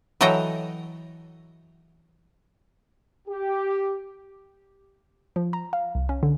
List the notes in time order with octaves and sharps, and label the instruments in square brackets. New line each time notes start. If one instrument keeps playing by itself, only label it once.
[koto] E3 F#3 A4 D#5 G5 A#5
[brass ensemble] G4
[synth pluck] F3
A#5
F5
C2
C#4
D3